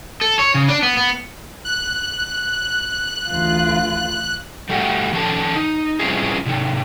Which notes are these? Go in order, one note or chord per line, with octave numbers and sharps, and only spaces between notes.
A4
C#5
C#3
D4
B3
B3
F#6
D2 E3 F4
G3 A3 F#4 G4
D#3 F3 C#4 A4 D5 A5
D#4
G3 C4 C#4 E4 F4 G#4
C3 D#3